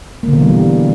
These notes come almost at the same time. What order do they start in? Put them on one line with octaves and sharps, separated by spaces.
A#3 D3 B2 E3 G3